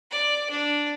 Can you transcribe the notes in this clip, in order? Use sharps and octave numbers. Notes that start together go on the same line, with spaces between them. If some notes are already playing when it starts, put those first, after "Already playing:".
D5
D4